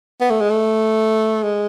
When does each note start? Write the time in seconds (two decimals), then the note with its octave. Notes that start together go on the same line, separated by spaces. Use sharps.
0.21 B3
0.31 A3
0.41 G#3
0.50 A3
1.44 G#3